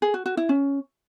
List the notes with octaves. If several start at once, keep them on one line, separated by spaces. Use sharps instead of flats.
G#4
F#4
F#4
E4
C#4